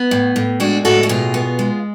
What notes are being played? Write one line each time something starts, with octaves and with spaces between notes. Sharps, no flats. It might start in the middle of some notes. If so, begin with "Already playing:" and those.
Already playing: B3
A2
A2
G#3 D4 F#4
A2 F#4 A4
F#4
B2 F4 G#4
B3
G#3